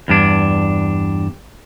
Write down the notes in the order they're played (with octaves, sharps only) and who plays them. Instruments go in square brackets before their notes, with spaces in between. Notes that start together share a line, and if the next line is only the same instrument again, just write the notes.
[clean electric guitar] E2 G2 D4